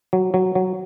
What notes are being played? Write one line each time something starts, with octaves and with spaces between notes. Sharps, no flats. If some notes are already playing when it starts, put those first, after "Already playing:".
F#3
F#3
F#3